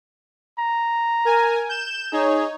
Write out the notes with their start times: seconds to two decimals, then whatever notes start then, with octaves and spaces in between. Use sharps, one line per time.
0.59 A#5
1.25 A#4 G#5
1.69 G6 E7
2.12 D#4 G#4 C#5